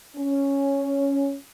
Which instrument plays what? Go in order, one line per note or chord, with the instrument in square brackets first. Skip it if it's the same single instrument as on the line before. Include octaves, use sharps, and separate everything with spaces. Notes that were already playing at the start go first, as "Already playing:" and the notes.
[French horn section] C#4